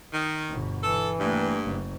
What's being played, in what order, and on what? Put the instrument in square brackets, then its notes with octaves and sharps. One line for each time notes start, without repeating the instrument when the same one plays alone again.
[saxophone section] D#3
[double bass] G1 B2
[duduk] E3 [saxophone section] A4
[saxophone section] G2 [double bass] A3 A#3
[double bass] F#1